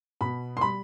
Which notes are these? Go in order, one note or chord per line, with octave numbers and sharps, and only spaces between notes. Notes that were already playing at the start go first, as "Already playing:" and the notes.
B2 B5
C6
G3 B5